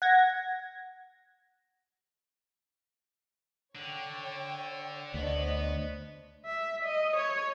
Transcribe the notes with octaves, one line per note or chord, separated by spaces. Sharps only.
F#5 G#6 A#6
D3 C#5 G5
D2 B3 D4 C5 C#5 D#5
E5
D#5
C#5